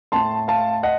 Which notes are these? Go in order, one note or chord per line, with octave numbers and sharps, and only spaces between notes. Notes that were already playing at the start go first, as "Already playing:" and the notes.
A2 A3 A5 C6
F5 A5
D#5 F#5